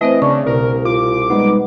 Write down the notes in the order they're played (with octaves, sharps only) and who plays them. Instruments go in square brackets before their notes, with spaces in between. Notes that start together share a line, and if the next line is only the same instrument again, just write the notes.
[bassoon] E3 [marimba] A3 C4 C5 [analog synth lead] D#5
[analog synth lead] C#3 [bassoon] D4 [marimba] C#6
[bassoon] C2 [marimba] B2 [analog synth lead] A#4
[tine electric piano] F4 [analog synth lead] D6
[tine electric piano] G3 G#3 D#4 [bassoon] B3